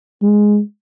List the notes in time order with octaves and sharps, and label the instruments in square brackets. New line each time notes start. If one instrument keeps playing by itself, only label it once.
[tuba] G#3